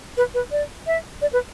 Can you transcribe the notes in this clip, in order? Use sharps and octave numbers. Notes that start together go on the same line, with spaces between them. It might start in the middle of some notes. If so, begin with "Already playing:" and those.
B4
B4
D5
E5
D5
B4